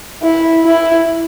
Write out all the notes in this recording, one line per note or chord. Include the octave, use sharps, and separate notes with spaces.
E4
E4